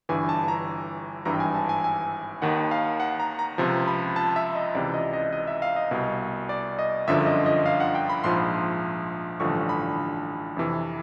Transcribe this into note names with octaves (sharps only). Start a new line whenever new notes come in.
G1 G2 E3 G#5
A5
A#5
G#1 G2 E3 A#5
G5
G#5
A5
G#5
G#5
D#2 D#3 F#5
F5
F#5
A#5
A#5
C#2 C3 F3
B5
A5
E5
D#5
C#2 C3 E3 D5
D#5
D#5
D#5
E5
F5
D#5
C2 B2
D5
D#5
G1 F#2 D3 F3 E5
D#5
D#5
F5
F#5
G5
B5
A#1 G#2 F3 C6
A1 G2 D3 F3 C#6
B5
F2 C3 E3